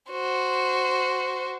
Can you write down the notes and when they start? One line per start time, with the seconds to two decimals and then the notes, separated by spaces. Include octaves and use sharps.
0.11 F#4 C5